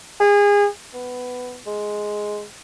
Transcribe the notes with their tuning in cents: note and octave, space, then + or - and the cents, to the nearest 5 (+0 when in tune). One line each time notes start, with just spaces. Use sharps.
G#4 -30
B3 +10
G#3 +5